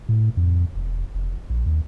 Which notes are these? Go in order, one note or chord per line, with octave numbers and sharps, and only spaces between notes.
A2
F2
E1
F1
A#1
D#2